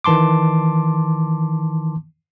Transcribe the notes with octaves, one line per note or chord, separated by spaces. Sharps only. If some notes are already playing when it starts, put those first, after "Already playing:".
D#3 E3 A5 C6 D6